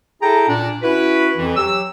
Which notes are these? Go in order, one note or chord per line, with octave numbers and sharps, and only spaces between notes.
E4 G#4 A4 G5 A#5
A#2 D4
C#4 E4 F#4 B4
F2 E3
F#3 G4 E6